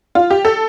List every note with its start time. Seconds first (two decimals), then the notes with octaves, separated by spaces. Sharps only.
0.15 F4
0.30 G4
0.45 A4